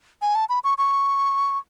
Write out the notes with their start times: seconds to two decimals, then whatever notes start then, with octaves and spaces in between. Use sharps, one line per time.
0.22 G#5
0.35 A5
0.49 B5
0.64 C#6
0.78 C#6